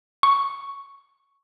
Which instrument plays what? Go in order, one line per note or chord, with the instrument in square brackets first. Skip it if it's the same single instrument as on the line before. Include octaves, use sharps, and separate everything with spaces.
[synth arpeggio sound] C#6